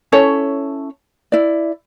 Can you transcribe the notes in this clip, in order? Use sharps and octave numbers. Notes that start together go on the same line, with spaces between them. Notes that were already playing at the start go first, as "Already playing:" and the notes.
C#4 E4 A4 C#5
E4 D5